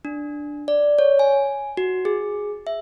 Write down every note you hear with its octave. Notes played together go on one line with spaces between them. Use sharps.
D4
D5
C#5
G#5
F#4
G#4
E5